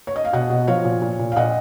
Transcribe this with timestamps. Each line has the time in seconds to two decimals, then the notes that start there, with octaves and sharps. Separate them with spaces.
0.07 C#5
0.16 D#5
0.25 F5
0.33 B2 D#5 F#5
0.50 B2
0.68 F3 C#5 F5
0.85 A#2
1.02 A#2
1.19 A#2
1.32 F5
1.36 A#2 D#5 F#5